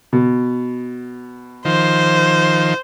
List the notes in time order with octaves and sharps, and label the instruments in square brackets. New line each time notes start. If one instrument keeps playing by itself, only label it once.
[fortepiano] B2
[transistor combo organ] D#3 F3 [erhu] C5